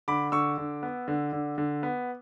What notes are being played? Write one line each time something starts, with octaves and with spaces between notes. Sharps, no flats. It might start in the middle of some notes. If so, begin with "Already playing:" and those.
D3 B5 D6
D3 C#6 E6
D3
B3
D3
D3
D3
B3